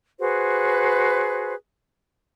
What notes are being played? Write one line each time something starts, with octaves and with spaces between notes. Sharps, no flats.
F#4 G#4 B4 C5